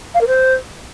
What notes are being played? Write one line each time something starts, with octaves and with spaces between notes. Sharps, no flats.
F5
A#4
C5